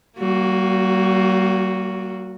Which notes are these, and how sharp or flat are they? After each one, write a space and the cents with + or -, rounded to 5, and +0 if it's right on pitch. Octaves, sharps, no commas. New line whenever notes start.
G3 -45 A#3 +0 F#4 +0